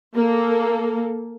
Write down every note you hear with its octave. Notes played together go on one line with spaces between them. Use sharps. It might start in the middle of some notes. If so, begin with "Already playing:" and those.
A#3 A4